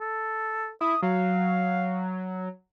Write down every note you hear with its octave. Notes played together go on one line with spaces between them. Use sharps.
A4
E4 D#6
F#3 F5